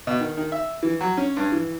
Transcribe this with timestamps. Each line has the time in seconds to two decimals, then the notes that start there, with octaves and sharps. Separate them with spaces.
0.07 B2
0.20 D#3
0.37 D#3
0.52 E5
0.83 E3
1.01 F#3
1.17 C#4
1.37 G2
1.52 E3